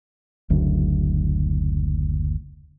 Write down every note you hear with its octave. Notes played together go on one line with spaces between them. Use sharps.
F#1 D2